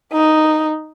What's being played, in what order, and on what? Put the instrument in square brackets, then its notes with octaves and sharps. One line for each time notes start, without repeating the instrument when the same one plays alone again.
[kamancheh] D#4